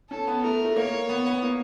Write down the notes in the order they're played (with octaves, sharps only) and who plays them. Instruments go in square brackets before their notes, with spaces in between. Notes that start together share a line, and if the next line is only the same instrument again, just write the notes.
[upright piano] C#4 [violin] A4
[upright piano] B3
[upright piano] A3 [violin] A#4
[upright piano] A3
[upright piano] A#3 [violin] C#5
[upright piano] B3
B3
A#3